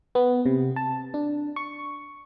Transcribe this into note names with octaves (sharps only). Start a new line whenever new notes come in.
B3
C3
A5
D4
C#6